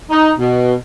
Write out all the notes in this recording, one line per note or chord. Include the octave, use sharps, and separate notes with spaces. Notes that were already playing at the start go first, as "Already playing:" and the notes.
D#4
B2